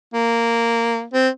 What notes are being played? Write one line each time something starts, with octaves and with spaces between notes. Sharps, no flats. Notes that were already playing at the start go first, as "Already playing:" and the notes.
A#3
C4